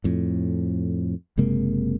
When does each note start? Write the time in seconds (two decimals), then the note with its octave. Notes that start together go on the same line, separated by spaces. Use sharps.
0.04 F2 A2
1.38 F#1 C3 G#3 A#3